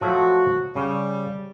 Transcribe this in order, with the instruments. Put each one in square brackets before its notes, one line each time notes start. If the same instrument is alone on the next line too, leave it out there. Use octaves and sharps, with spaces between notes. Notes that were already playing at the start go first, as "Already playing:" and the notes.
[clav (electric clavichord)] F3 F#3 A3 [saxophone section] F#4
[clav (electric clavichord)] C#3 [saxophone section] G3